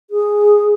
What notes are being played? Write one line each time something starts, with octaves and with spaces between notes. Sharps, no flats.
G#4